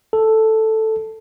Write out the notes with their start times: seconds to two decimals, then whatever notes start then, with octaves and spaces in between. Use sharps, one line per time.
0.13 A4